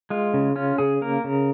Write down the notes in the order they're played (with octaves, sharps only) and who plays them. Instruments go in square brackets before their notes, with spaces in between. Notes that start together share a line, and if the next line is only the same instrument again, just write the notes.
[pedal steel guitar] G#3 F4
C#3
C#4 F4
C#3 G#4
A#3 A#4
C#3